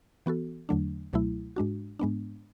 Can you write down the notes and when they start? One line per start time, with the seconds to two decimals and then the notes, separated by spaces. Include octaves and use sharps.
0.26 E3 B3 F#4 A4
0.69 E2 D3 F#3 A3 D4
1.13 C#2 B2 F#3 A3 E4
1.56 G#2 G#3 D4 F#4
1.99 G#2 G#3 B3 D4